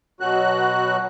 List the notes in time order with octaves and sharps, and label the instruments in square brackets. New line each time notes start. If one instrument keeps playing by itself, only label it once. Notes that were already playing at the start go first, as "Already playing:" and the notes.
[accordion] B2 F#3 F#4 F#6